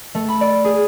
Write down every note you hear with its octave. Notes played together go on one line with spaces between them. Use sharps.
A3
B5
D5
G#4